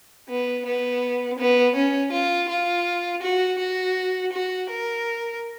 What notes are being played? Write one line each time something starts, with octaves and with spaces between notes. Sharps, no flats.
B3
B3
B3
C#4
F4
F4
F#4
F#4
F#4
A#4